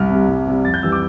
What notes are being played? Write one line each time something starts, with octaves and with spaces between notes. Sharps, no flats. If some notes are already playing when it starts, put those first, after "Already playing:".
Already playing: C2 F6
C3 G3
C2
C3 G3
F2 A6
G6
E3 G3 E6
D6